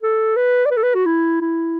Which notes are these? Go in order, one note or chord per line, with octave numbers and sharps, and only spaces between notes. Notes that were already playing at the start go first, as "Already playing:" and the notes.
A4
B4
D5
B4
A4
B4
F#4
E4
E4